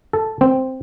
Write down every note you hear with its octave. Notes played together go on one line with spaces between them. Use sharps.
A4
C4